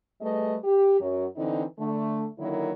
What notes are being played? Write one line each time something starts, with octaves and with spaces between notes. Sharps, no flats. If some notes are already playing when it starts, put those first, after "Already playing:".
G3 A3 G#4 B4 D#5
G4
F#2 F#3
D3 E3 C4 D#4
D3 A3
D3 D#3 F#3 A#3 E4